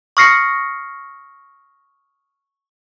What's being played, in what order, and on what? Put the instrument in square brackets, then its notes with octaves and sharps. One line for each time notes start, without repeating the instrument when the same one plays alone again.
[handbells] C#6 D#6 F6 A#6 C7 C#7